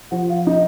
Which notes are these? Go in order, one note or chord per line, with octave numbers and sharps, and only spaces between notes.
F3 F#5
F5
D#4 D#5